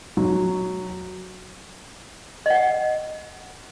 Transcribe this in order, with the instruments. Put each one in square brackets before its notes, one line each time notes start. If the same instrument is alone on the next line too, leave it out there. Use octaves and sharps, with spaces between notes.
[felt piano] F#3
[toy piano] D#5 F#5